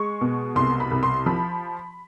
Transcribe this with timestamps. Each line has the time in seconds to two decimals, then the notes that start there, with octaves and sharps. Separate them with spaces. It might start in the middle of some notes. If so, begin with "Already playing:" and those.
Already playing: G#3 C#6
0.21 B2
0.55 C2 C6
0.80 B5
0.91 C2
1.03 C6
1.26 F3 B5